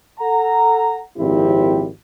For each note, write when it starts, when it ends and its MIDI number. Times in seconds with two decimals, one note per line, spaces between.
0.19 0.99 69
0.19 0.99 78
0.19 0.99 82
1.17 1.86 32
1.17 1.86 46
1.17 1.86 53
1.17 1.86 60
1.17 1.86 64
1.17 1.86 67